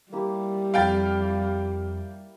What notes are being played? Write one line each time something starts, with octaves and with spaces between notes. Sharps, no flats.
G3 A#3 E4 G4
F2 F5 G5 B5 A6